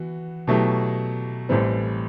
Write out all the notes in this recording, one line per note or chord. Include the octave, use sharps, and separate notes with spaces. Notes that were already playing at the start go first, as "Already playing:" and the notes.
Already playing: E3 B3 F#4
B2 F#3 A3 E4 G4
A1 A2 E3 G3 C4